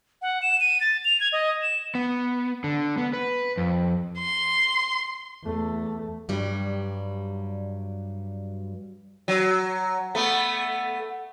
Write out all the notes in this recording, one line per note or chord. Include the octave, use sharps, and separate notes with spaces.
F#5
E7
D#7
A6
F7
G#6
D#5
E7
B3
D3
B3
B4
F2
C6
E2 A3
G2 F#3 G3
F#3
A3 B3